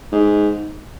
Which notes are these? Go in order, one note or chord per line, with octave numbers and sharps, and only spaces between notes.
G#2